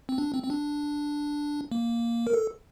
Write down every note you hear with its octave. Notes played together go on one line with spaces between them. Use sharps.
C4
D4
C4
C4
D4
A#3
A#4
A4